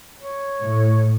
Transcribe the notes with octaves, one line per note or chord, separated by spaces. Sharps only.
C#5
A2